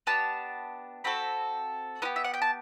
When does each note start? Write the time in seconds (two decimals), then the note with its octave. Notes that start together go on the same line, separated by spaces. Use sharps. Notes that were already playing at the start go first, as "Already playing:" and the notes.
0.07 B3 D4 G4 A5
1.04 C4 F#4 A4 B5
2.02 B3 E4 G4
2.16 E5
2.24 F#5
2.34 G5
2.42 A5